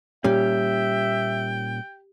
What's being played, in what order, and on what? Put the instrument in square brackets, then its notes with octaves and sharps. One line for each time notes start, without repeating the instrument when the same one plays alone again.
[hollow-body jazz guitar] A#2 G3 C#4 [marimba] G4 [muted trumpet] E5 [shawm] G5